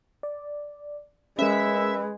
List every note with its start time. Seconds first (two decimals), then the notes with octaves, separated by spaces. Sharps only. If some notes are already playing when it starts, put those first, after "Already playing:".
0.23 D5
1.39 G#3 C#4 A#4 B4 E5